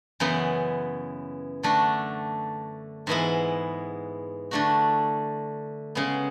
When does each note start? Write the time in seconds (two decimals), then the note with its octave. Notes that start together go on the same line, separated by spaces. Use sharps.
0.20 F#2 C#3 E3 B3 E4
1.63 D3 A3 D4 F#4
3.07 G#2 E3 G#3 B3 E4
4.51 D3 A3 D4 F#4
5.95 C#3 G#3 B3